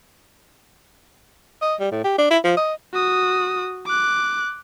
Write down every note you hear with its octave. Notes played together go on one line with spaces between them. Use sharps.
D#5
G3
A2
G4
D4
E4
F3
D#5
F#4 D#6
D6 F#6